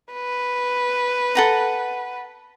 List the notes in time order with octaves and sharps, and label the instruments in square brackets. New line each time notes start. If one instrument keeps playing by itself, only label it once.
[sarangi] B4
[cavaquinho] A4 F#5 A#5